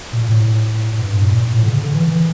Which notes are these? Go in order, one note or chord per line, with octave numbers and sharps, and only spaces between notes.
A#2
A#2
A2
A2
G2
A2
A#2
A2
D3
C#3
D3
E3
E3